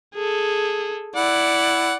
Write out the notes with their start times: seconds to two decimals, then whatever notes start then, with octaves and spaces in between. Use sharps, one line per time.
0.15 G#4 A4
1.16 E4 D5 F#5